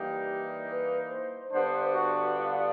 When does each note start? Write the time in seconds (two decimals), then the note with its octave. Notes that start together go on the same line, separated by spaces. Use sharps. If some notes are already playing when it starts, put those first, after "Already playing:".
Already playing: E3 G3 A#3 D#4 G4
0.69 B4
1.10 C5
1.52 G2 D3 G3 B3 D4 C5
1.95 F#4
2.38 F4